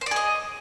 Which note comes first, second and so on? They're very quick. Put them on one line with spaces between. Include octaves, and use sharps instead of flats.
C5 D5 G#4 D#5